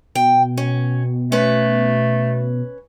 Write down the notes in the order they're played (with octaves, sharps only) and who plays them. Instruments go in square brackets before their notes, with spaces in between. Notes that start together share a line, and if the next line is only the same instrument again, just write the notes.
[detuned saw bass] B2 [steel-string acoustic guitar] G5
[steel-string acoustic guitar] C#4
[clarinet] A3 [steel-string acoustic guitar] C#4 B4